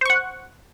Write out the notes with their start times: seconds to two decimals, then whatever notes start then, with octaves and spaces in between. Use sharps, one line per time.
0.01 C5
0.06 C#6
0.10 F#5